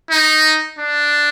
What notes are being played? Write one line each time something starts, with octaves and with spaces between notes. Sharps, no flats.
D#4
D4